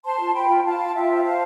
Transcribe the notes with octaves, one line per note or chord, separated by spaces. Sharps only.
C5 A5 C6
F4
C5 G5 B5
F4
F4 F5 A5
F4
F4 E5 G5
C5
C5 F5 A5